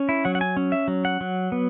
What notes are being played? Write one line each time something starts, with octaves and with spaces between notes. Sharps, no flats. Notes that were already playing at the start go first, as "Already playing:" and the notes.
Already playing: C#4
E4
F#3 F#5
F#5
G#5
C#4
E5
F#3
F#5
F#3
B3